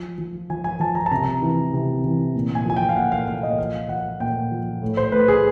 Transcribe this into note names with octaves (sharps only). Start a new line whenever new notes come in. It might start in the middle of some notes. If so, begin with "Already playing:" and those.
Already playing: F3
F3
F3 G#5
G#5
F3 A5
A#5
A5
C3 A#5
E3
C3
E3
A#2
G#5
F3 G#5
G5
F5
A#2 F#5
F5
A#2 F5
D#5
F3 F5
F3 F#5
A#2 G5
F3
A2
C5
A2 B4
G#4